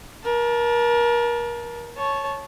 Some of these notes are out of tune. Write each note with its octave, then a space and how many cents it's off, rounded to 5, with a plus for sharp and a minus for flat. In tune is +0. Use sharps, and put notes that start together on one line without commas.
A#4 +30 A5 -10
C#5 -5 A5 -20